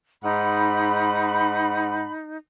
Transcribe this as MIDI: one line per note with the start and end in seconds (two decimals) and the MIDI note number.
0.24 2.09 44
0.24 2.37 63
0.24 2.09 78
0.24 2.12 83